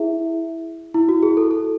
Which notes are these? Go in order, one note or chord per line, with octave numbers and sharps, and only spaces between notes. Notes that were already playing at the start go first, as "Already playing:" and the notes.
Already playing: E4 G#4 E5
E4
F#4
G#4
A4
A4